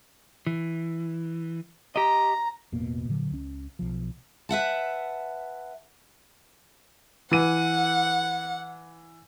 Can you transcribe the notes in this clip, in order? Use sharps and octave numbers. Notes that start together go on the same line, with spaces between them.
E3
G4 D#5 A#5
E1 A1 B2 A#3
A#2 D3 F#3
C#2 C#4
B1 F3
B4 E5 F#5 A5
E3 F#5 D#7